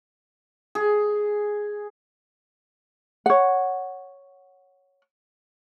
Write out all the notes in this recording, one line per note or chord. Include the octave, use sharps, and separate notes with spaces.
G#4
C#5 F#5